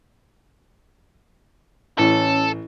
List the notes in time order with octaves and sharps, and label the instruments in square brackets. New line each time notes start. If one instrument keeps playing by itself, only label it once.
[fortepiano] A1 [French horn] C#4 [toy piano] E4 G4 [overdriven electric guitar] A4